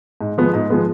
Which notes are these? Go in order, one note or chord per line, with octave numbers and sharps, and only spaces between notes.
G#2
F3 G#3 B3
G#2
F3 G#3 B3